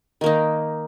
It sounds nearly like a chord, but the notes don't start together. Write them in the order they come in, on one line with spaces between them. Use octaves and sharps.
D#3 A#3 D#4